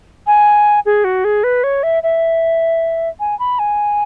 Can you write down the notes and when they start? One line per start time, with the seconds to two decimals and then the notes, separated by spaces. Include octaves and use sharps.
0.27 G#5
0.86 G#4
1.04 F#4
1.25 G#4
1.44 B4
1.64 C#5
1.83 E5
2.03 E5
3.20 G#5
3.39 B5
3.59 G#5